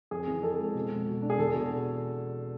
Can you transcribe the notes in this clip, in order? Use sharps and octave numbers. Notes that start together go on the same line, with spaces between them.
F2 G#4
E3
F2 A4
G#3
B2
G#3
B2
D4
G#4
E2 A4
B2